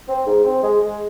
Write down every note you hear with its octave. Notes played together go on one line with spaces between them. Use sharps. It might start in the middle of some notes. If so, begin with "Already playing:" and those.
C4
G#2
C4
G#3
G#3